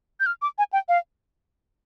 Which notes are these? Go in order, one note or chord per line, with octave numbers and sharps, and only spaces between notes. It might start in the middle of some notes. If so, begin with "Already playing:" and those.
G6
F6
D6
G#5
G5
F5